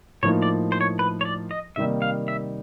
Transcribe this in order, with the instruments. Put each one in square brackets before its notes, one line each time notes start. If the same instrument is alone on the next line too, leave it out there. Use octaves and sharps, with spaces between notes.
[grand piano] A2 F3 A#3 D#4 [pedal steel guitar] C#5
[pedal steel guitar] D5
C5
C#5
B4
C#5
D5
D#5
[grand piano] C3 D#3 G3 A#3 D#4 [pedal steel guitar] E5
[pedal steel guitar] F5
E5